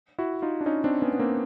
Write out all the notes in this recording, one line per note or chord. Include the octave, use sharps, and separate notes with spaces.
E4 F#4
D#4 F4
D4
C#4 D#4
C4 D4
B3 C#4
B3
A#3 C4